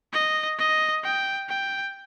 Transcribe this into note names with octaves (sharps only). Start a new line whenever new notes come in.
D#5
D#5
G5
G5